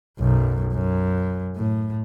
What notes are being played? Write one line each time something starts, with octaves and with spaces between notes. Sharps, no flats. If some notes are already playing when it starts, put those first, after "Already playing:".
B1 F#2
F#2
A2